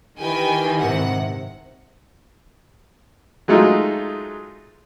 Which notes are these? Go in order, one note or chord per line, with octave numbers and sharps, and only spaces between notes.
D#3 E3 G4 B4 G5 G#5
G#2 C3 F#5
F#3 G#3 A3 D#4 F4